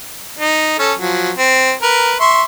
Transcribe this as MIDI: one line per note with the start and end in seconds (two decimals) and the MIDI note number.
0.39 0.77 63
0.79 0.93 61
0.79 0.93 69
0.99 1.31 53
0.99 1.31 54
1.36 1.72 60
1.82 2.15 70
1.82 2.15 71
2.20 2.43 76
2.20 2.43 84
2.20 2.43 85